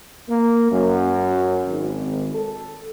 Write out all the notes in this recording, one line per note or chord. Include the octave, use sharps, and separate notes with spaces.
A#3
F#2
G#1
A4